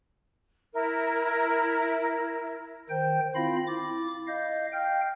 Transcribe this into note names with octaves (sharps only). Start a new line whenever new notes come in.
E4 A#4
D#3 C5 G5 G6
C4 E4 F4 F5 B5 A#6
E4 D6 A6
D#5 F5 G6
F5 G5 F6 G6